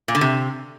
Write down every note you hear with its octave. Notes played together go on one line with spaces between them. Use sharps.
A#2
D3
C3